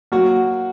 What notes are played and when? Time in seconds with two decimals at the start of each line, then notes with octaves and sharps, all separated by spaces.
0.12 F#3 A#3 F#4